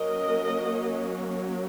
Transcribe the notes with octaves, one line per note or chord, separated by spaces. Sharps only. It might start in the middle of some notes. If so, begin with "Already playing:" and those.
Already playing: F#3 A#3 C#4 A#4 D#5